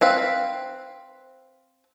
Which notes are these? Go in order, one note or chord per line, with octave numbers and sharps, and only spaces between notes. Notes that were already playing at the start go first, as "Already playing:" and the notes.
C4 B4 F5